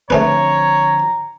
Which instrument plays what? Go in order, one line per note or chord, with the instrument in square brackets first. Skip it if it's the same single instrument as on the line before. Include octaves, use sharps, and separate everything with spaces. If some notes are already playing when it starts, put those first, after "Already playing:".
[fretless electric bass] D3 F3 C4 [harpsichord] A3 C#4 B4 [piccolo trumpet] C#5 [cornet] A#5